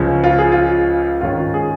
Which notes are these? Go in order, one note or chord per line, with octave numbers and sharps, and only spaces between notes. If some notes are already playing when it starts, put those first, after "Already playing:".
Already playing: C#2 C#3 F3
F4
G#4
F4
G#2 D#3 G#3 C#4 F4
G#4